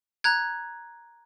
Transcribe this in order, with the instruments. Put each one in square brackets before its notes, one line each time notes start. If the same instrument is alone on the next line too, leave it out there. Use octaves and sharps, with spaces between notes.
[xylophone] A#5 F#6 G#6